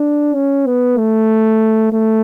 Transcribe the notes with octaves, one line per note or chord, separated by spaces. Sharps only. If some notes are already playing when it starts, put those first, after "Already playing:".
Already playing: D4
C#4
B3
A3
A3